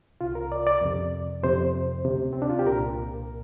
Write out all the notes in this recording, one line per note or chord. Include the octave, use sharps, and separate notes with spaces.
C2 C3 F4
A#4
D5
D5
F2 C3
F2 C3 C5
D2 C3
C4
D4
F4
G4
C2 A#2 A#4